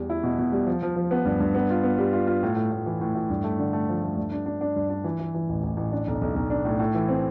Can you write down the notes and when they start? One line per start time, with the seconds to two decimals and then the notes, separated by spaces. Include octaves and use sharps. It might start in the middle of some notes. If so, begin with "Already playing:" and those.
Already playing: E2 G3
0.10 E4
0.24 B2
0.38 B2
0.52 G3
0.67 F3
0.82 F3
0.96 F3
1.11 B3
1.26 G2
1.40 G2
1.54 B3
1.70 F4
1.83 B3
1.98 G3
2.13 F4
2.27 F4
2.43 A2
2.56 A2
2.72 A2
2.86 E3
3.01 A2
3.15 A2
3.30 G2
3.44 A3
3.59 D3
3.73 A3
3.88 F3
4.03 A3
4.17 G2
4.32 D4
4.46 D4
4.61 D4
4.76 G2
4.90 D4
5.04 E3
5.19 E3
5.35 E3
5.49 A1
5.63 A1
5.77 A1
5.92 D4
6.07 B1
6.21 B1
6.36 B1
6.50 D4
6.65 A2
6.79 A2
6.95 E3
7.09 C4